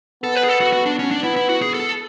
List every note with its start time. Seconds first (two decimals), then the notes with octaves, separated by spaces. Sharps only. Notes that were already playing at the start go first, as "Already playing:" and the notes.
0.23 B3 A4
0.35 B4
0.44 G#4
0.48 A4
0.61 F#4
0.73 F#4
0.86 D4
0.99 C#4
1.11 D4
1.23 B3 E4
1.36 E4
1.49 F#4
1.62 G#4
1.74 A4